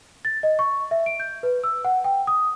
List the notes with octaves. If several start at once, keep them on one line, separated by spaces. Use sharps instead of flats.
A6
D#5
C#6
E5
D7
G6
B4
E6
F#5
G5
D#6